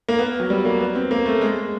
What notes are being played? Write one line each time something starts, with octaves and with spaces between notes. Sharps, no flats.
A#3
B3
F#3
G3
A#3
B3
C4
A#3
A3
G#3